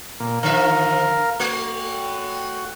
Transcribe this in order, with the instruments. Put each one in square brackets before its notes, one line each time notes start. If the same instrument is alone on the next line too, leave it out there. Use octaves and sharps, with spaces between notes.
[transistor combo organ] A#2
[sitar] D3 F3 E5 [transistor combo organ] A#4 F5
[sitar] A3 [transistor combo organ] F#4